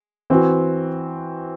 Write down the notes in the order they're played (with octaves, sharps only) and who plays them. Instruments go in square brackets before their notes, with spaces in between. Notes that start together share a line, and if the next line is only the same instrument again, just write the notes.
[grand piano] E3 C4 F#4